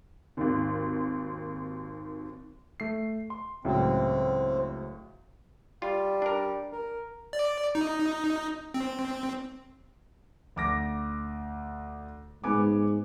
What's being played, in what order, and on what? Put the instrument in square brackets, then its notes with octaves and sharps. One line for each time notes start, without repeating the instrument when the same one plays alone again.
[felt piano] G#1 D#2
[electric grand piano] A3 C7
C6
[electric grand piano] C#2 A2 F#3 [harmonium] C4
[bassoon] G3 [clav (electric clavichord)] F4
[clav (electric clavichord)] D4 A#4
[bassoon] A#4
[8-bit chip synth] D5
D#4
C4
[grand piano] D2 D6 A#6
[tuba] G#2 [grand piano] B3 G#5 D6